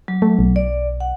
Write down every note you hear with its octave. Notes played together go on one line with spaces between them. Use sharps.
F#3
A3
B1
D5
F#5